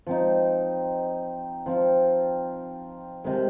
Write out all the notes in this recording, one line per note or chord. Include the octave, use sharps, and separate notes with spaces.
F3 C4 D#4
F3 C4 F4
C3 D#3 G#3